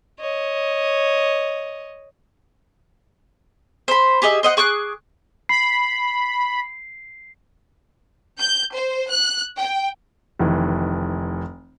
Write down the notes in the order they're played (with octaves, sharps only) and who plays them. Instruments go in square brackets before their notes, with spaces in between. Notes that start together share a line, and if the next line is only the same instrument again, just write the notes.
[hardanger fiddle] C#5 D#5
[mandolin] C5 B5
G4 G#4 D#5 E5
C5 D#5 F#5
G#4 C#6 D6 F#6
[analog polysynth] B5 [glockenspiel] C7
[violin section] G6
C5
F#6
G5
[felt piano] F1 D#3 E3